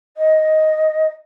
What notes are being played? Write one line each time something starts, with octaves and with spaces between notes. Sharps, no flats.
D#5